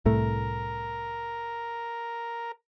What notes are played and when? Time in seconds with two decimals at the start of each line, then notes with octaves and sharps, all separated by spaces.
0.06 C2 A2 A3 A#4